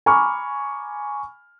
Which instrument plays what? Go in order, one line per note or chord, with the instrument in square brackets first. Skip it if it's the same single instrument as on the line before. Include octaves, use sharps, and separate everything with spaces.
[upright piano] G#5 A#5 B5 C#6 D6 F6